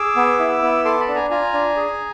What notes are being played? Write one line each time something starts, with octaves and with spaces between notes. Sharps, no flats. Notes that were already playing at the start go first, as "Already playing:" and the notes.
Already playing: G#4 D6 E6
B3
E4
B3
A4 C6 D6
A5 B5
D4
G#5 A#5
F4 G#5 A#5
D4
G#4